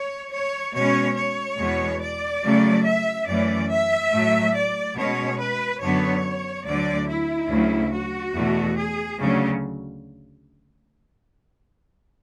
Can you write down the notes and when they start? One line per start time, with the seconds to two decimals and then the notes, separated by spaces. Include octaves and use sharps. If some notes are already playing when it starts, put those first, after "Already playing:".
Already playing: C#5
0.32 C#5
0.74 B2 G#3 C#4 C#5
1.16 C#5
1.58 E2 B2 G#3 B3
2.01 D5
2.43 C#3 F#3 A3 C#4
2.85 E5
3.27 F#2 E3 A3 C#4 D5
3.70 E5
4.12 A2 F#3 A3
4.55 D5
4.96 B2 G#3 C#4 C#5
5.39 B4
5.81 F#2 D3 F#3 B3 C#5
6.65 D2 D3 F#3 D5
7.08 E4
7.49 D2 C#3 F#3
7.92 F#4
8.35 E2 B2 A3
8.77 G#4
9.18 D2 C#3 F#3 C#4